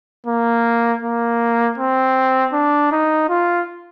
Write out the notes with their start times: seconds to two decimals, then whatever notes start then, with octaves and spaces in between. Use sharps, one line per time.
0.27 A#3
1.03 A#3
1.78 C4
2.53 D4
2.92 D#4
3.29 F4